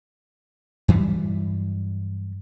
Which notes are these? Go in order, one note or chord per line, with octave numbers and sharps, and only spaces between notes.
G2 E3 F#3 G3